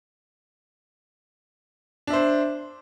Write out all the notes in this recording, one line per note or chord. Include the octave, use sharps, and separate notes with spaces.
D4 C5 E5